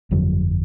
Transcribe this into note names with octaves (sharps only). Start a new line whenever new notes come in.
G1 F2 D3 F#3